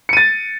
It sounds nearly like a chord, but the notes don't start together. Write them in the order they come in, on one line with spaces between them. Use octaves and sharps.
C#7 D#7 A6